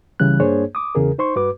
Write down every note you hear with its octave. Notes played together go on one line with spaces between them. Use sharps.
C#2 C#3 E3 G3 F#6
G2 A#3 D4 G#4 C5 C#5
D6 D#6
E2 C#3 G#4 A#4
D#4 C5 C6 C#6
G2 F#4 B4 D6